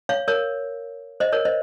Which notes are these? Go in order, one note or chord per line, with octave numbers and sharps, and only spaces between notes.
C#5 F5
A#4 C#5
C5 D#5
A#4 C#5
C5 D#5